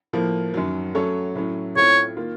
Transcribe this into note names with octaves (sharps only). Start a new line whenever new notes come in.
A2 F3 A#3
F#2 D#3 F#3
F#3 A3 C#4 A4 C#5
A2 F#3 A3 C#4
A2 A3 C4 F4 C#5
D#3 A#3 F4